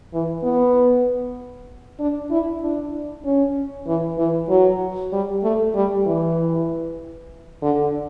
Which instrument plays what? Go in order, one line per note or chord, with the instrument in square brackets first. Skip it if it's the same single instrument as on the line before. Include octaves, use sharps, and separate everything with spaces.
[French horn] E3
B3
D4
E4
D4
C#4
E3
E3
F#3
G3
A3
G3
E3
D3